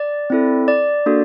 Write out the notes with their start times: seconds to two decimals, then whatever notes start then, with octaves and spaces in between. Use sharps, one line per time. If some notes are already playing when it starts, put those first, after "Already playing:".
Already playing: D5
0.30 C4 E4 A4
0.68 D5
1.06 A#3 D4 F#4 A4